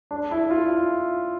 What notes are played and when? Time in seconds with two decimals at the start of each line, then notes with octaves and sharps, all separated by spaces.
0.11 D4
0.31 E4
0.51 F4